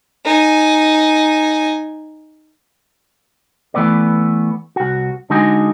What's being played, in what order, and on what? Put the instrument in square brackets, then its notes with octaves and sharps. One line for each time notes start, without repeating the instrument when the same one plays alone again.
[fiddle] D#4 G#5
[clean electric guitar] E3 A3 B3 B4 D5
C2 F#4
D3 G#3 D#4 F#4 G#4